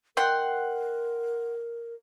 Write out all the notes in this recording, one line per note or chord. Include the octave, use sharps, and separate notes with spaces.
D#3 A#4 F#5 G5 C6